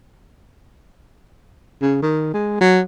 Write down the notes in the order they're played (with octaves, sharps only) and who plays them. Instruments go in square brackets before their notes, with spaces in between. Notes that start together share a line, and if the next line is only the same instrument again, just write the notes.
[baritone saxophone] C#3
D#3
G#3
F#3